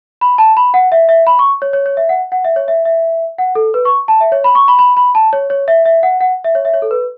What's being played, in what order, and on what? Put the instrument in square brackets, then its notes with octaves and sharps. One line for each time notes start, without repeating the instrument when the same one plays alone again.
[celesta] B5
A5
B5
F#5
E5
E5
B5
C#6
C#5
C#5
C#5
E5
F#5
F#5
E5
C#5
E5
E5
F#5
A4
B4
C#6
A5
E5
C#5
B5
C#6
B5
B5
B5
A5
C#5
C#5
E5
E5
F#5
F#5
E5
C#5
E5
C#5
A4
B4